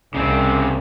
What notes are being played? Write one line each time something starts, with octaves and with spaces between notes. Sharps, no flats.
C2 C#3 C4